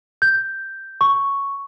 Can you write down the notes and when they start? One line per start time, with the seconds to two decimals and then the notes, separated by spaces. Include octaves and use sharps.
0.22 G6
1.01 C#6